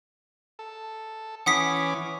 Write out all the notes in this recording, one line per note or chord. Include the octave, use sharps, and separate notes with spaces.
A4
E3 C#4 F#5 D6 D#6 B6